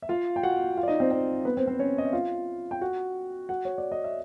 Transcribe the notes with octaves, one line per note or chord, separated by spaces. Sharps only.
E5
F4 F5
G5
F#4 F#5
F4 F5
D5
D#4 D#5
C4 C5
C4 C5
B3 B4
C4 C5
C4 C5
C#4 C#5
D#5
E5
F4 F5
G5
F#4 F#5
F#4 F#5
C#5
D5
D#5
E5